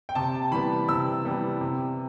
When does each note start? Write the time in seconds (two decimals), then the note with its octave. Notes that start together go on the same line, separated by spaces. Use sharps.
0.09 G5
0.15 C3 A5
0.51 E3 G3 B3 B5
0.88 C3 E6
1.25 E3 G3 B3
1.61 C3